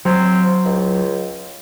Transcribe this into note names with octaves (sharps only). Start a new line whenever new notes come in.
F#3 C4
C#2